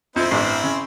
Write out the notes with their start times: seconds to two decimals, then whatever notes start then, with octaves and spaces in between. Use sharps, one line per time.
0.16 F2 C4 E4 C5
0.31 A1 G2 C6
0.64 C#3